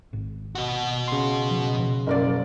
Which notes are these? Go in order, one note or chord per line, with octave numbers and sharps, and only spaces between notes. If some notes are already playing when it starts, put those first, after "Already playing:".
G#1
B2 F#4
C#3 C6
F3
B2 F3
F#1 A#4 D5